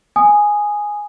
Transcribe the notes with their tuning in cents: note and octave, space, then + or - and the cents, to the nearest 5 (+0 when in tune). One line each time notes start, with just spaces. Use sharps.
G#5 +0 D#6 -10